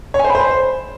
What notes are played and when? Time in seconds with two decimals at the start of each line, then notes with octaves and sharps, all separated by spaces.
0.14 C#5
0.19 G#5
0.24 C5
0.30 B5
0.35 C5